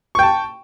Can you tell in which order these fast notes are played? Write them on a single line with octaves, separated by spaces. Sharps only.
C#6 G5 A5